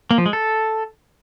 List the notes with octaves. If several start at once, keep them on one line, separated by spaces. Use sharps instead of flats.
A#3
F3
G#3
A4